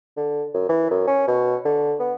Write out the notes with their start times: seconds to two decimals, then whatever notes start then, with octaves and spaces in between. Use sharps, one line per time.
0.17 D3
0.54 F#2
0.69 E3
0.90 F#2
1.07 C#4
1.28 B2
1.65 D3
1.99 B3